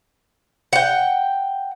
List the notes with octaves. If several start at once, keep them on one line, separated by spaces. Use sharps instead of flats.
F#5 G5